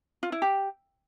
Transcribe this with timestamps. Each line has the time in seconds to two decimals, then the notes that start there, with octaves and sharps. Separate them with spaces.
0.23 F4
0.32 E4
0.42 G4